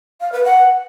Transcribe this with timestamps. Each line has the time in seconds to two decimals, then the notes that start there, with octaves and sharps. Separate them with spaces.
0.20 F5
0.32 B4
0.44 F#5